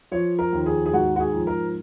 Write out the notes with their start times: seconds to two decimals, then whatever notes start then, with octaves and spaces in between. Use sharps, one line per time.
0.11 F3 C#5
0.39 A#4
0.53 D#2
0.66 G#4
0.86 G#4
0.93 G#2 F#4
1.16 F#4
1.20 G#4
1.33 F3
1.47 A#4